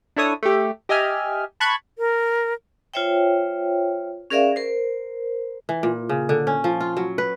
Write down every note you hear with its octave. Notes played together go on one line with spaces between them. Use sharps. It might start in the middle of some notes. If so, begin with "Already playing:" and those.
D4 E4 A4 C#5 D#6
A3 G4
G4 D#5 E5 G#5 F6
A5 B5 C#6 F#6 G#6
A#4
F4 C5 C#5 E5 G5
C#4 G#4 A#4 D5 E5 F5
A#4 C5
E3
A#2
C#3
D3
C#4
F3
F4
F#3
B4